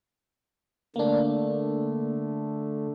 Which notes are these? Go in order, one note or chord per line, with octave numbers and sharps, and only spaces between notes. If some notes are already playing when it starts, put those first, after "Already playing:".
D3 A3 A#3 D4